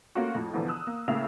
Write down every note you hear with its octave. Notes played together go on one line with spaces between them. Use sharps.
A3 A#3 C#4 F4 F#4
F2 A2
E2 B2 D3 E3 F3
D#6 E6 F#6
A#3
A2 C#3 A#3 E5 F5 F7